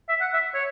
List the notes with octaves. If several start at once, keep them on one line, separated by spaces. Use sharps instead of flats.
E5
F#5
E5
C#5